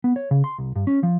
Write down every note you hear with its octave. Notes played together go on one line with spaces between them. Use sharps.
B3
C#5
C#3
C6
C2
G2
C#4
F3